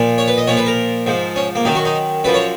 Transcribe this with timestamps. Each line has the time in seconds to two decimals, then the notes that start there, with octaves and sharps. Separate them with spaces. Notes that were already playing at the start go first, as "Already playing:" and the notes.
Already playing: A#2 F3
0.18 C#5
0.28 B4
0.38 D#5
0.47 A#2 F3 C#5
0.57 B4
0.66 A#4
1.06 G#2 F3
1.36 C#4
1.55 A#3
1.65 F#2 D#3 D#4
1.75 F#4
1.85 D#4
2.24 F#2 F3 B4
2.34 C#5